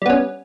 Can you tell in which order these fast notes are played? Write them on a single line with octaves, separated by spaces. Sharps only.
G3 B3 C#4